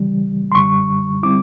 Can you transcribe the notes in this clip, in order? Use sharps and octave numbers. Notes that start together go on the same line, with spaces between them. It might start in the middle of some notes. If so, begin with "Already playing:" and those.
Already playing: C#3 E3 G3
C6
F#2 D3 G3 C#6
D3 G3 C4 E4 D6